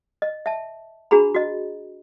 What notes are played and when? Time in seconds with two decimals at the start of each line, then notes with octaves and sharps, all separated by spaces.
0.22 D#5
0.46 E5 A5
1.11 D4 F#4 G#4 A#5 B5
1.35 F#4 D#5